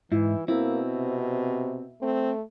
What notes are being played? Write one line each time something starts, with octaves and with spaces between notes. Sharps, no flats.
G#2 E3 E4
B2 A#3 C4 E4
C3
A3 C4